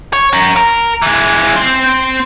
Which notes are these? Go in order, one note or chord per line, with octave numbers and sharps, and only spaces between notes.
C#5
C#4 A#4
A#4
E3 G#3
C4 C5